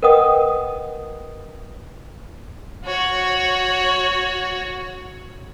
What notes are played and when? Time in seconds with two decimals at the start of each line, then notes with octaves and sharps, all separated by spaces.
0.03 A#4 B4 D#5 F#5 G5 D#6
2.86 F#4 C#5